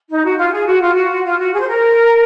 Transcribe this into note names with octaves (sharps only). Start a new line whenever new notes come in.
D#4
F#4
F4
G#4
F#4
F4
F#4
F4
F#4
G#4
C5
A#4